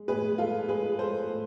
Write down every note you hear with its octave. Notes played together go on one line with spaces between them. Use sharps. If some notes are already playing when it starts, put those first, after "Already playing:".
Already playing: G#3
A2 G#4 B4
G#3 F4 A4
G#3 G#4 B4
G#3 A4 C5
A2